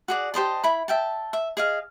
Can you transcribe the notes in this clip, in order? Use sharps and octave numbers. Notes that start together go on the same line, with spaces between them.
F#4 G#4 D5
G4 C5 D#5 A5
E4 B5
E5 G5 A5
E5
G#4 D#5 F5